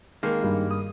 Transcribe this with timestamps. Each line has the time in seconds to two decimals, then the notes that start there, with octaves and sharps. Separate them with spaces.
0.23 D#3 G#3 A#3
0.43 G2
0.71 D#6